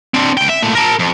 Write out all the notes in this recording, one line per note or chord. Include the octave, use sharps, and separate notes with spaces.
C4 D4
C#2 G5
E5
A#2 A3
A#4 A5
F2